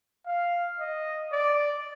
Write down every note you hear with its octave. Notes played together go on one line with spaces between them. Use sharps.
F5
D#5
D5